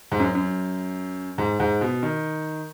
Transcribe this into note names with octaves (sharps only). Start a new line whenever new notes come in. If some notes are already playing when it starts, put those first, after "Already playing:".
G#2
F#2
F#2
G#2
G#2
B2
D#3